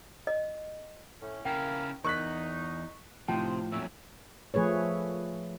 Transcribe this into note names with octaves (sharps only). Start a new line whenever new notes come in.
D#5
A2 C#4
C#3 A#3 C#4 E4 A#4 G5
E2 D#4 A#4 C#6 F#6 B6
A2 C3 F3 D#4 C5 G5 A5
F2 A#2 F#3 C#4 E5
F3 A3 G#4 B4 C#5